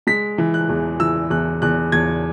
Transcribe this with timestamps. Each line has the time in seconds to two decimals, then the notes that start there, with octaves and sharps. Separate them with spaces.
0.07 G#3 B6
0.38 E3
0.54 F#6
0.69 E2
1.00 E3 E6
1.30 E2 F#6
1.62 E2 F#6
1.92 E2 G#6